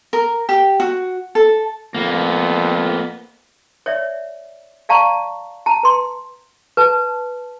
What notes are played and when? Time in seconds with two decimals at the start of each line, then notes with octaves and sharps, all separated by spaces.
0.13 A#4
0.49 G4
0.80 F#4
1.35 A4
1.94 F2 A#3 B3
3.86 C#5 D5 E5
4.89 D5 F5 A5 A#5 C#6
5.66 A5 A#5
5.83 B4 C6
6.77 B4 A5